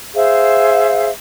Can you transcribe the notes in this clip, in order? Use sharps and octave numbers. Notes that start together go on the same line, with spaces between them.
G#4 C5 E5 F5